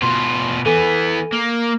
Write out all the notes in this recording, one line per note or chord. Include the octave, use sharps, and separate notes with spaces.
B2 F4 C6
E3 B3 A4 G#5 D#7
A#3